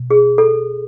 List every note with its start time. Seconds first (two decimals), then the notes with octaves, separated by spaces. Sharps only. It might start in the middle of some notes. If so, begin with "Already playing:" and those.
Already playing: B2
0.10 G#4
0.38 A4